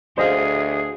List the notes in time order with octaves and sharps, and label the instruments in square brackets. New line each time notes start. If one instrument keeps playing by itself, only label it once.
[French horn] D2 [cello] G#4 [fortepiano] C5 D#5 F5